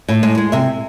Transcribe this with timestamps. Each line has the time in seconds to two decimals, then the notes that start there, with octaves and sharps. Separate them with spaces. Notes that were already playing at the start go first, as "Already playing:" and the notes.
0.09 A2
0.23 G#3
0.38 G#3
0.52 C3 E5